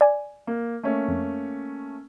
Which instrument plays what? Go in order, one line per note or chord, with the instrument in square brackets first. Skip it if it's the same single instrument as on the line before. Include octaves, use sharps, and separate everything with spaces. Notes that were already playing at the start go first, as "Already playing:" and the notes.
[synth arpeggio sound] D5 G#5
[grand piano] A#3
A3 A#3 C#4
[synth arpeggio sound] F2